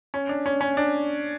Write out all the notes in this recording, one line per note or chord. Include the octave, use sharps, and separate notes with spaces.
C#4
D4
C#4
C#4
D4